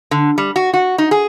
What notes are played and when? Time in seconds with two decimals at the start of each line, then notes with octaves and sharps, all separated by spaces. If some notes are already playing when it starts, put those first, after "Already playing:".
0.11 D3
0.38 G3
0.56 F#4
0.74 F#4
0.98 D#4
1.11 G#4